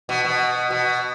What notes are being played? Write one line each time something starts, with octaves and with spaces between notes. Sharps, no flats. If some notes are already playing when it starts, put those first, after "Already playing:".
B2
B2
B2